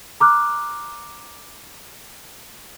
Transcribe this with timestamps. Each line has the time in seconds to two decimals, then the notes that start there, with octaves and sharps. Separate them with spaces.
0.20 A#5 D6 F6 F#6